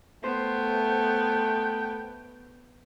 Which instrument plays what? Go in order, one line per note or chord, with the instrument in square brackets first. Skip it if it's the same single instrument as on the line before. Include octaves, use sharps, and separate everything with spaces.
[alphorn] A3 [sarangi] B3 [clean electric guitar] C5 [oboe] G5